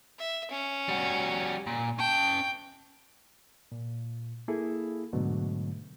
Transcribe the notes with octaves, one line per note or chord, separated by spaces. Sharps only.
E5
C#4
G3 F#4
A#2
C#4 G5 A5
A#2
A#3 E4 G#4 A4
G#2 B2 D3 F#3 A3